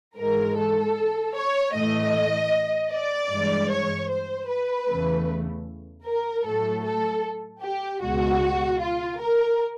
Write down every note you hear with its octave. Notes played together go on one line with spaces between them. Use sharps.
G#2 E3 G#3 A#4
A4
C#5
A2 E3 A3 D#5
D5
G2 E3 G#3
C#5
C5
B4
E2 C#3 E3 A3
A#4
A2 F#3 A3 A4
A4
G4
C#2 B2 G#3 F#4
F4
A#4